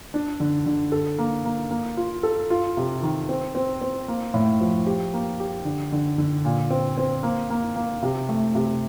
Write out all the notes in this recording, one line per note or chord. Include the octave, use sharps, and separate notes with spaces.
D4
D3
D3
A4
A#3
A#3
A#3
F4
A4
F4
C3
D#3
C4
C4
C4
A#3
A2
F3
G4
A#3
G4
D3
D3
D3
A#2
C4
C4
A#3
A#3
A#3
C3
A3
C3